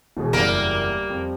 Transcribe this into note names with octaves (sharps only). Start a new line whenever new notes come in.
E1 B2 G#4
F#1 E2 G3 A#3 A#4 D5
F2